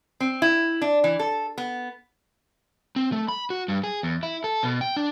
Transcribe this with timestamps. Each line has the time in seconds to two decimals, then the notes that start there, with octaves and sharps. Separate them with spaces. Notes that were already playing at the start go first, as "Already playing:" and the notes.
0.20 C4
0.42 E4
0.81 D4
1.04 E3
1.19 A4
1.58 B3
2.96 C4
3.12 A3
3.28 B5
3.50 F#4
3.68 G2
3.84 G#4
4.03 E2
4.23 E4
4.44 A4
4.63 B2
4.81 G5
4.97 D4